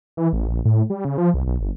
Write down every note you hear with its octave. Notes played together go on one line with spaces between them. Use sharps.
E3
A1
A#1
A2
G3
C#3
F3
C2
B1
G1